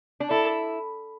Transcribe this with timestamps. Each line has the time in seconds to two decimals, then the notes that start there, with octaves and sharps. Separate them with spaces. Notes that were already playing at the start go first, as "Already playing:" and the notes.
0.20 D4
0.30 E4 A4